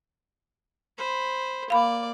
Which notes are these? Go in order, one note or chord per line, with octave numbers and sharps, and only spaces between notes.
C5 B5
A#3 D5 F5 B5